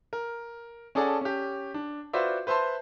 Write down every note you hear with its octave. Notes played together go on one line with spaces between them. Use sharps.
A#4
C#4 G#4 A4 D5 F#5 A5
C#4 G4
D4
F4 F#4 B4 C5 D5 E5
B4 C5 E5 A5 C6